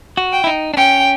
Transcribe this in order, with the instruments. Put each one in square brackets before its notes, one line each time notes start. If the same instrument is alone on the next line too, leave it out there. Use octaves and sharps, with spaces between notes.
[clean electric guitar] F#4
[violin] G5
[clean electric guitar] E4
D#4
D4
[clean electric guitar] C#4 [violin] G5